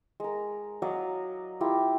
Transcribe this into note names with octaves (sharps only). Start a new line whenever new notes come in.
G#3 A#4
F#3 D5 D#5 F5
E4 F4 G4 A#4